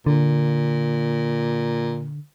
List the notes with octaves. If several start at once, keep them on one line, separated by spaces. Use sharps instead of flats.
A#2 D3